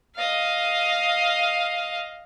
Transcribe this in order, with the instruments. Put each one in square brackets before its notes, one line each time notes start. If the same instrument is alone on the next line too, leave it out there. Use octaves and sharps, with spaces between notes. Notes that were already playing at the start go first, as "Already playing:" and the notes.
[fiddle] D#5 F5